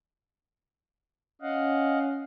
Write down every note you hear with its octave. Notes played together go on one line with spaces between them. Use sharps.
C#4 D#5 F5 F#5